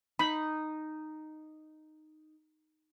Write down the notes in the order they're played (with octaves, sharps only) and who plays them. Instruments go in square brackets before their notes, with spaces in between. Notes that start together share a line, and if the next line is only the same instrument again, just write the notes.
[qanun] D#4 [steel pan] B5